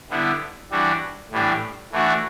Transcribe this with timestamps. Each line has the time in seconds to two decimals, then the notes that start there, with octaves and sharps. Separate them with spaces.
0.10 D3 G3 B3 E4
0.71 E3 G3 D4 F#4
1.31 A2 E3 G3 D4
1.92 E3 A3 D4 F#4